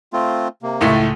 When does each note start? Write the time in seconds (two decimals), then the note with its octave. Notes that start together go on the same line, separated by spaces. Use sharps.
0.13 A3 C4 F4
0.63 C3 A#3
0.81 C#2 A2 A3